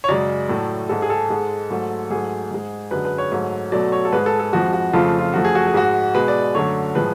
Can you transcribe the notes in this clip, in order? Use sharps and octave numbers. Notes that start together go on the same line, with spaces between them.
C#5
F#2 C#3 G#3 D5
A2 F#3 A3
G#2 G#3 A4
G#4
A4
G#2 G#3
G#2 F#3 A3
G#2 F#3 A3 G#4
G#2 G#3
F#2 D3 G#3 B4
B4
C#5
G#2 F#3 A3
B2 F#3 A3 D5
C#5
A4
G#2 G#3 B4
A4
A4
F2 F3 G#3 F#4
F#4
F2 C#3 F3 A3 F4
F4
F#2 F3 A3 F#4
G#4
F#4
G#4
G#2 G#3 F#4
B2 G#3 B4
D5
F#2 D3 F#3 A3 C#5
A2 F3 G#3 B4